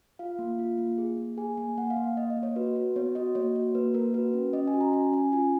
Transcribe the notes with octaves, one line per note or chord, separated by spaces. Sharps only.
F4 F5
A#3
F4
A#3
G#4
A#3
G#4 G#5
A#3 G#5
A#3 F#5
F5
A#3
F5
A#3 D#5
D#5
A#3
C#5
F#4 B4
F#4
B3 C#5
F#4 D#5
A#3 C#5
F#4
A#3 B4
A#3 A#4
F#4 B4
C#4
C#4 D#5
G#5
F#4
A#5
C#4 G#5
C#4 G#5
F4 G#5